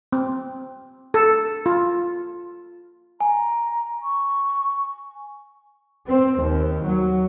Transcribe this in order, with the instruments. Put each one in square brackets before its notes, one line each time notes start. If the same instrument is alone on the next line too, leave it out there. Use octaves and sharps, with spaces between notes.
[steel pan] C4
A4
F4
[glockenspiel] G#5 [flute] A#5
[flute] C#6
[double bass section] C4
D#2
F#3